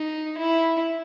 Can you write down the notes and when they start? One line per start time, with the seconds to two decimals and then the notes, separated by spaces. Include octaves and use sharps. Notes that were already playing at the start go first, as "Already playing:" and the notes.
Already playing: D#4
0.37 E4